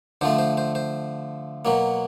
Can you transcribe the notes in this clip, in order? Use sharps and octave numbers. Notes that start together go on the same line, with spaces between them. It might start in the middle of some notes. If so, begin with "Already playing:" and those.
D3 F3 A3 C5
C5
C5
C5
B2 F#3 A#3